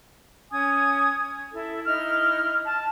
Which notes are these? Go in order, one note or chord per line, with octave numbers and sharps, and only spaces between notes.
C#4 G#5 D#6 G#6
E4 A4
D#4 E4 F6
A5